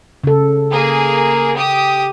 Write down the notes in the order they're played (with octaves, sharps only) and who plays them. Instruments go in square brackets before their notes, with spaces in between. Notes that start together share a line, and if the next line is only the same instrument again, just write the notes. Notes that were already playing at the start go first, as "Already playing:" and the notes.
[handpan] C#3 A4
[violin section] A#3 G#4
G4 D#6